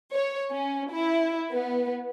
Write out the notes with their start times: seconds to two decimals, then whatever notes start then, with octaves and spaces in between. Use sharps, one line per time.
0.13 C#5
0.51 C#4
0.91 E4
1.51 B3